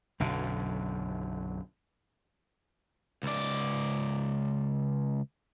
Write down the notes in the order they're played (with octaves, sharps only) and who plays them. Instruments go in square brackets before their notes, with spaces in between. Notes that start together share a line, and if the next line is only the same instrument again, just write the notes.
[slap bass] B1 F#2 D3
[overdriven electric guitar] C#2 D5